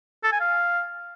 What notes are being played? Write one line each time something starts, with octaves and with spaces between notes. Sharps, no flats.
A4
G#5
F5